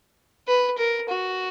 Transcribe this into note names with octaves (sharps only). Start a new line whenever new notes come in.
B4
A#4
F#4